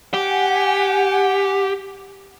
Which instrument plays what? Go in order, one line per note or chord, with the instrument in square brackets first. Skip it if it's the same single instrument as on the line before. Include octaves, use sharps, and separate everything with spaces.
[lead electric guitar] G4 [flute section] F#5 G#5